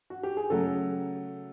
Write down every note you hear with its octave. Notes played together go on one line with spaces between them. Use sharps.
F#4
G4
G#4
C#3 F#3 A3 A4